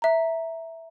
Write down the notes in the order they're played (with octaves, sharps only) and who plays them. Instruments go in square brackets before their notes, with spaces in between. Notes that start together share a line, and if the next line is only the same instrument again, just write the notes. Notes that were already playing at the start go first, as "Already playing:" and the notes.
[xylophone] E5 A#5